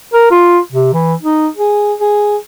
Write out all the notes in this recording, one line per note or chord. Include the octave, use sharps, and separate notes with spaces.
A#4
F4
C3
E3
D#4
G#4
G#4